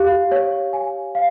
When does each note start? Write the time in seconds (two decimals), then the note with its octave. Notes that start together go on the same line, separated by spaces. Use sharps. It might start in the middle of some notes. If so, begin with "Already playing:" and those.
Already playing: G4 F5
0.32 C#5
0.73 G#5
1.15 F5